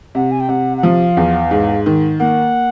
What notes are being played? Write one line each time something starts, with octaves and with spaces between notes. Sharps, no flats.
C3 F#5
G#5
G5
C3 F#5
F#5
F3 F5
E2
G#2
D#3
A#3 F#5